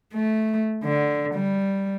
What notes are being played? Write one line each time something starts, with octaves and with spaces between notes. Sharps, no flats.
A3
D3
G3